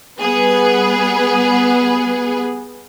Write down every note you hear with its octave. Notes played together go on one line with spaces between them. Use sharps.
G3 B3 G#4 B4